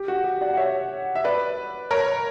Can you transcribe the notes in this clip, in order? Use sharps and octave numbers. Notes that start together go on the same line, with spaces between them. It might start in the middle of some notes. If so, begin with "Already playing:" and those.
Already playing: G4
F#4
G4
D5 F#5
F#5
C#5 E5
E5
B4 D5
A#4 C#5